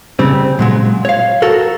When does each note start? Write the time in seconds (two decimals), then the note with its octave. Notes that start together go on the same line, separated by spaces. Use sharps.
0.19 C#3 G3 C4
0.59 A#2 F#3 G#3
1.05 C#5 F5
1.42 F#4 A4 A#4